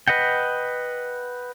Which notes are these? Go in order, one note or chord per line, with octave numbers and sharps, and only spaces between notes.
B4 D#5 F#5 G5